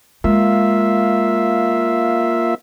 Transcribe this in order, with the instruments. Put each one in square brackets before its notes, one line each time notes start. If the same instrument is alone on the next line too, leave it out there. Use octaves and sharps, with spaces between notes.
[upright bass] G#3 [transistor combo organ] A#3 F4 E5